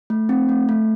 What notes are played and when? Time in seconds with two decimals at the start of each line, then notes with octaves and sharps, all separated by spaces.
0.10 A3
0.29 C4
0.49 A3
0.69 A3